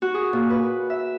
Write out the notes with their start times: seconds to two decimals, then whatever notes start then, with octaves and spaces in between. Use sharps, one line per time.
0.02 F#4
0.14 G#4
0.33 A#2
0.50 B4
0.90 E5